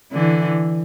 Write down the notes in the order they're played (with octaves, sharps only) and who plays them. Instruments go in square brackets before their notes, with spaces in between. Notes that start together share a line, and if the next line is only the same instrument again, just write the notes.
[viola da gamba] D3 E3